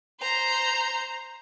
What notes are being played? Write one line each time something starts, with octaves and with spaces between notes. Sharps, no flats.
C5 A#5